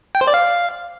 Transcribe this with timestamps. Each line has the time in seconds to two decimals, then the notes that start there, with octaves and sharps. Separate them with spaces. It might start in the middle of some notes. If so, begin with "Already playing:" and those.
0.15 G5
0.21 C5
0.27 D5
0.34 F5